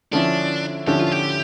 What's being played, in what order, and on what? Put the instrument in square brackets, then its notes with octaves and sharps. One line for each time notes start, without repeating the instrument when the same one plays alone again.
[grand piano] D3 F3 C#4 E4 [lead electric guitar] D4
[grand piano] D3 F3 C#4 E4 [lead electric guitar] G4
[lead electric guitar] F4
G4